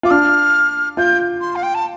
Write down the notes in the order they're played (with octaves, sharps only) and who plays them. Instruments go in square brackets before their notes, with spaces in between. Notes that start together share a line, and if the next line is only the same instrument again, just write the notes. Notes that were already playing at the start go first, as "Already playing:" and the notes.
[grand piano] F4 [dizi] D6
[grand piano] D4 [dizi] F6
[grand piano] F4 [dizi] G6
[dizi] C6
F5
G5
A5